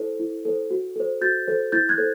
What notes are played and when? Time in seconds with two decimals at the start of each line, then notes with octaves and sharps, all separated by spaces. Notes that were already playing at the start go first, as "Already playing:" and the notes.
Already playing: E4 A4 C5
0.20 E4
0.45 A4 C5
0.71 F#4
0.96 A4 C5
1.21 F#4 G6 A6
1.48 A4 C5
1.72 E4 G6 A6
1.89 F#6 G#6
1.98 A4 C5